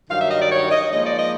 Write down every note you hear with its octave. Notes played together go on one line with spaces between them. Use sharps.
G2 D#3 F#3 F5
E5
D#5
D5
C#5
D#5
G#2 F3 A#3 D#5
D5
D#5